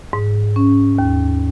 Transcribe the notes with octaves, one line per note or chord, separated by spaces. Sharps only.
G#2
C#4
D#2